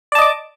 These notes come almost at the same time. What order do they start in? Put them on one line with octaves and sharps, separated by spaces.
D5 A5 D#5 D6